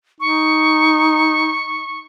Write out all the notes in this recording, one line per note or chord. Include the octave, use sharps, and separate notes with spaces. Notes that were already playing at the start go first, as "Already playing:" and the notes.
D#4 C#6